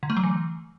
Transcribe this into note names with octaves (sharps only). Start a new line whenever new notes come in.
D3
A3
F#3
E3